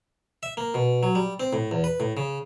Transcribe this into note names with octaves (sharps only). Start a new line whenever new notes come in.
E5
A#3
B2
F#3
G3
C4
A2
E2
B4
A2
C#3